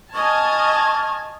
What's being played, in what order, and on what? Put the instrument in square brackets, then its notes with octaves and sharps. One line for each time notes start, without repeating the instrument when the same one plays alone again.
[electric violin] D#5 G#5 [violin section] A5 F6 G#6 [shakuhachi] C#6